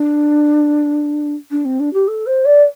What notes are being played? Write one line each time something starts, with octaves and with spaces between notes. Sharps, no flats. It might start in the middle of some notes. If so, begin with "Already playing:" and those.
Already playing: D4
D4
C4
D4
G4
A4
C5
D5